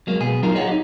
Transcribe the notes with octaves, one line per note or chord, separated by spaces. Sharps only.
F#3 G#3 A#3
B2 B3 G#4
F#3 A#3 D#4 F4 A#4
G#4 C#5 D#5 F5 F#5
D#4 G4